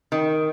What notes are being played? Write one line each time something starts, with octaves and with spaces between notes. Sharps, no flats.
D#3